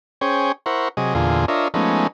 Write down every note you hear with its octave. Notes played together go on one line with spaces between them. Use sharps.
C#4 G#4 C5 C#5 G5
E4 A#4 C5 F#5 C#6
C3 F#3 G#4 D#5
E2 A#2 D3 F4 G#4
D4 F4 A#4 C#5 D#5 E5
F3 G#3 A3 B3 C#4 D#4